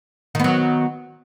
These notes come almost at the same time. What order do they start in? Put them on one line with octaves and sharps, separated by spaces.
D#3 B3 F#3